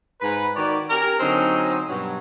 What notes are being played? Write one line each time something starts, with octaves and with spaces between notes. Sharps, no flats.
G#2 B4
D#3 F#4 C#5 D5
C#4 G4 A#4
D3 F#3 C4 C#4 D#4
G2 B2 F#3